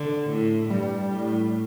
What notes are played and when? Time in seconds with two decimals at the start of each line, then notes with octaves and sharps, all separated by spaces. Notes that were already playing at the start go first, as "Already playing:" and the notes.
Already playing: D3
0.30 A2
0.70 G2 G3
1.11 A2